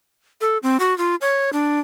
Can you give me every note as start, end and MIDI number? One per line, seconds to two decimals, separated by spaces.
0.41 0.58 69
0.63 0.77 60
0.80 0.96 66
0.98 1.15 65
1.21 1.50 73
1.53 1.80 62